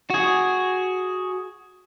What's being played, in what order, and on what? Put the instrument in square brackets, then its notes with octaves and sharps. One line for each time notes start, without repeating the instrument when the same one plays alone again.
[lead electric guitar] F#4 G#4